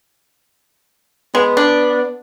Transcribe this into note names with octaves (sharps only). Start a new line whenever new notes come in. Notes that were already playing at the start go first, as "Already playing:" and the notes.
G#3 B3
D4